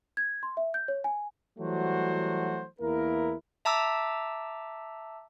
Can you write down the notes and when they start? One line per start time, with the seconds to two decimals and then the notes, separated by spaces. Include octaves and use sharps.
0.17 G#6
0.43 C6
0.57 E5
0.74 G6
0.88 C#5
1.04 G#5
1.59 E3 F#3 G3 A3 F#4 C5
2.81 E2 A#3 E4 A#4
3.65 E5 A5 A#5 D6 E6